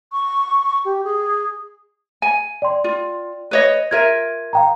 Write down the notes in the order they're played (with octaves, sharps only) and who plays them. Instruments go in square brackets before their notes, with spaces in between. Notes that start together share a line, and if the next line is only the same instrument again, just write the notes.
[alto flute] C#6
G4
G#4
[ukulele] G#5
[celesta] D5 G5 C6
[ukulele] F4
B4 C#5 D#5
[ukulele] F4 A#4 E5 [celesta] G#6 D#7
[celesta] F5 G5 A#5